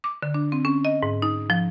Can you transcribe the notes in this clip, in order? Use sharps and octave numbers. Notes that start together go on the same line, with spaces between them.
D6
D3
D4
C4
C#4
D#5
G#2
D#4
F3